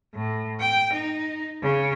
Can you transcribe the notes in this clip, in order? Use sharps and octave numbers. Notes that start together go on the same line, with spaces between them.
A2
G5
D#4
C#3